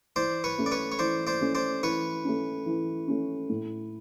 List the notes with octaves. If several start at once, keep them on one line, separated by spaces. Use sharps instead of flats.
E3 C5 D5
B4 C#5
A3 C#4
D5
B4 C#5
C#5
E3 C5 D5
C5 D5
A3 C#4
C5 D5
E3 B4 C#5
A3 C#4
E3
A3 C#4
A2